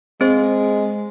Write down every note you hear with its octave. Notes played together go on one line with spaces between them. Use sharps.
G#3 C4 C5